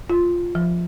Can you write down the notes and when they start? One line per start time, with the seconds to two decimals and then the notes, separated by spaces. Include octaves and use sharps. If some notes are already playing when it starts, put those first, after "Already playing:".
0.10 F4
0.55 F3